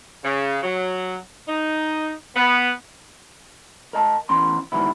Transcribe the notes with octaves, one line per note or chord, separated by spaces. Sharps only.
C#3
F#3
D#4
B3
A#4 D#5 A5
E3 B3 C#4 C6
G#2 D#3 E3 G3 B3 E4